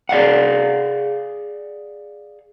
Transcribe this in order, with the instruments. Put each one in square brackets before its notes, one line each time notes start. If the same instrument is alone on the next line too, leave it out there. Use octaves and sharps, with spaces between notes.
[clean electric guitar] G#4 D5 F5 F#5